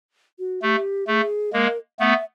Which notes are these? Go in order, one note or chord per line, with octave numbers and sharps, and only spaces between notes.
F#4
A3 G4
A3 G#4
G#3 A#3 A#4
A3 B3 E5 F5